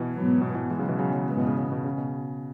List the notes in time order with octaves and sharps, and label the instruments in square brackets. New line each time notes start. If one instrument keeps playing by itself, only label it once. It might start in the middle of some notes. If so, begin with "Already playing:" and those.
Already playing: [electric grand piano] B2 E3
[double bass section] G#2 F#3 B3
[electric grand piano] B2
B2 E3
E3 G#3
C#3 F#3
B2 E3
C#3 F#3
C#3 F#3
[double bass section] G#2 G#3 B3 [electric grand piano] C#3
[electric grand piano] B2 E3
C#3
C#3
B2
C#3
B2